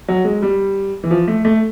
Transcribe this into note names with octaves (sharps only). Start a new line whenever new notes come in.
F#3
G#3
G3
E3
F3
A3
A3